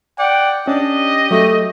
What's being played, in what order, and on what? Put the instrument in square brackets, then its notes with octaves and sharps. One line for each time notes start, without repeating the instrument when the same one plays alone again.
[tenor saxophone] D5 [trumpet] F#5 [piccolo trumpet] G5
[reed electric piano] C#4 [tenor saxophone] D4 [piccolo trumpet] G4 [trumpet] D#5
[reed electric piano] F#3 [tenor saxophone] A3